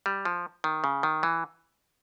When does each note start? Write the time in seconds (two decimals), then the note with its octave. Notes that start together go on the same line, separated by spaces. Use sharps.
0.06 G3
0.25 F3
0.64 D#3
0.84 C#3
1.03 D#3
1.23 E3